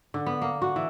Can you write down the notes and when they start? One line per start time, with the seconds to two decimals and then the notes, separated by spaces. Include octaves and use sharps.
0.14 D3
0.26 B3
0.42 A#3
0.62 F#4
0.76 E3